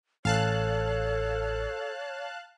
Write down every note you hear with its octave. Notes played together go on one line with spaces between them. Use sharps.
A1 A4 C#5 F5 A5 F#6